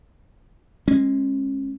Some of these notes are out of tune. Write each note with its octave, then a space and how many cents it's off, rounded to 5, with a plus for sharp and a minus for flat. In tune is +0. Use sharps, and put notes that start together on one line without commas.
G#3 +0 C#4 -30